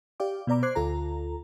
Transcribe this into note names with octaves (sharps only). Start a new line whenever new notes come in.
G4 D5 F5 G5 D6
B2 B3 D5 A#5 D6
C5 D6 F#6 G#6 C7
D2 F4 A4 A#5